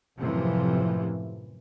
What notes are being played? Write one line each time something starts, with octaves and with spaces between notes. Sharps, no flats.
F#2 A2 C3 E3 F3